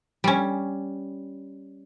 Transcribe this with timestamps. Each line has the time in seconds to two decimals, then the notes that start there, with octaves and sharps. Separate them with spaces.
0.24 G3 C#4